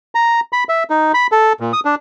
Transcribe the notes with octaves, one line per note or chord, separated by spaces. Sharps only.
A#5
B5
E5
D#4
B5
A4
A#2
D#6
D4